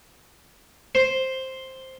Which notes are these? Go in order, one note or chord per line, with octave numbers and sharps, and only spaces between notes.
C5